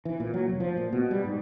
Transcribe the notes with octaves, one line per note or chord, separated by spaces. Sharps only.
E3
A#2
F#3
F1
F3
A#2
B2
G3
G#2